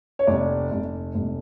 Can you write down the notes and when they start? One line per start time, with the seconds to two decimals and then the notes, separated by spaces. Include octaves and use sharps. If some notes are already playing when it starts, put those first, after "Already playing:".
0.19 C#5
0.27 F1 D5
0.71 F1
1.14 F1